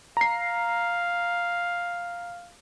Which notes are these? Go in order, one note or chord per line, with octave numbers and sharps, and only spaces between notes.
F5 A#5 C7